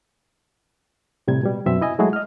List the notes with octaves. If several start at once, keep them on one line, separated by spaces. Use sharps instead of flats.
A2 C3 G3 G#6
B2 G3
F#2 B2 C4 E5
E4 D#5 G#5
F#3 G#3 A3 E4 F#4 G#4
D#5 F6